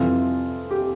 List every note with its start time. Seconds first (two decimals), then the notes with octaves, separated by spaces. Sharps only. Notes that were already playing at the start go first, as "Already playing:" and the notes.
Already playing: F2 C3 E3 G3 F4
0.71 G4